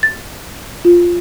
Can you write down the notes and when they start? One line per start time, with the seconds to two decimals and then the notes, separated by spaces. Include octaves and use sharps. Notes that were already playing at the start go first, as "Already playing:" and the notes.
0.03 A6
0.85 F4